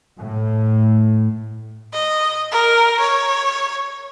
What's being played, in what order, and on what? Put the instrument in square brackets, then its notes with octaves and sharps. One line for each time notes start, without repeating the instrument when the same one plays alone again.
[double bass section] A2
[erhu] D#5
A#4
C#5